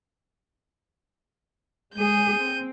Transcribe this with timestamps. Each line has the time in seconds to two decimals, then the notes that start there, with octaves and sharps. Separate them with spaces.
1.94 G#3 G#4 G6 D#7
2.37 C4